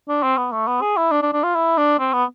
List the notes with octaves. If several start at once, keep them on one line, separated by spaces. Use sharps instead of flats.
D4
C4
B3
A3
B3
G#4
E4
D4
D4
D4
F4
E4
D4
C4
B3